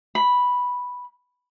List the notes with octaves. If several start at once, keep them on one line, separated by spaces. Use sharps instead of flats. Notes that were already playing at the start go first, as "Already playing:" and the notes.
B5